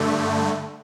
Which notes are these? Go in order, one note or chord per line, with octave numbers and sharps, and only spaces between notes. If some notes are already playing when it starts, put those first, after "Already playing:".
Already playing: G2 D3 A3